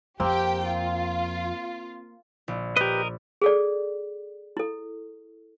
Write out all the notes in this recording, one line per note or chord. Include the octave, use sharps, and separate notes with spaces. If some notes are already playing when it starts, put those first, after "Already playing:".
F2 A#3 C4 G4 G5
F4
A#1
G4 A#4 B4 D#5
G#4 A4 D5
E4 A4